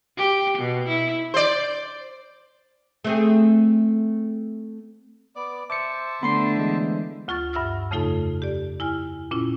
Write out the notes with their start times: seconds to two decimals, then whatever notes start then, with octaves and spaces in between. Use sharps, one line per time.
0.17 G4
0.58 B2
0.88 E4
1.34 C5 D5
3.04 A3 C4 G#4
5.36 B3 D5 D6
5.70 C5 E5 A5 D6 C#7
6.23 D3 A3 B3 B5 C6 C7
6.57 E3 G#3
7.28 D2 F4 C#6 F6 A6
7.53 G2 E5 F#5 E6 F6
7.91 F2 C#3 A3 D#4 F4 A4
8.42 G4 D5
8.80 E4 G#5 F6
9.31 A#2 C#4 E4 F4